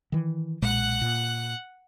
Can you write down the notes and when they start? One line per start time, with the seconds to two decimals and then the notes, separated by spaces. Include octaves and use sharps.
0.12 D#3 E3
0.62 B1 A#2 G#3 F#5 F#6
1.01 A#2